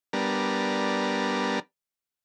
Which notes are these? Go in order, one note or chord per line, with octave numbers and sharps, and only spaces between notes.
G3 B3 D4 A#4